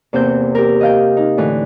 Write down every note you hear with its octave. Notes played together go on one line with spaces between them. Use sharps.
E2 C3 A#3 C4 G6
G4 A#4
D#5 F5 G5
D#4
A2 D3 E3